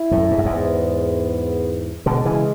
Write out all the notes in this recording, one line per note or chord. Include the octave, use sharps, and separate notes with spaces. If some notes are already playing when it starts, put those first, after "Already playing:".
Already playing: E4
F#2 A2
G#2
F#2
E2 G#2 B3
B2 D3 G#3
C#3 E3